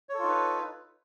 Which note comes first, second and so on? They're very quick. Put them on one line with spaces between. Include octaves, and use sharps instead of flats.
C#5 A4 F4 D#4 B4